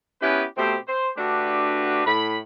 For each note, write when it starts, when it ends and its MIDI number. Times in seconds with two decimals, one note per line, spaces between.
0.21 0.44 59
0.21 0.44 61
0.21 0.44 64
0.21 0.44 67
0.21 0.44 68
0.21 0.44 71
0.57 0.76 47
0.57 0.76 57
0.57 0.76 60
0.57 0.76 67
0.57 0.76 72
0.87 1.09 72
1.17 2.05 50
1.17 2.05 57
1.17 2.05 62
1.17 2.05 66
1.17 2.05 67
1.17 2.05 71
2.06 2.38 45
2.06 2.38 83